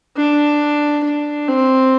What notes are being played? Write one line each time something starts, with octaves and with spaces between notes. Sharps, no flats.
D4
D4
C4